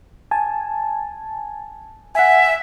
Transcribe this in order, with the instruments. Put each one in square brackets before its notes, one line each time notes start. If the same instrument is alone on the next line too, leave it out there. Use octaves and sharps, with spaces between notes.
[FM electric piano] G#5 A5
[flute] E5 [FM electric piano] F#5 G#5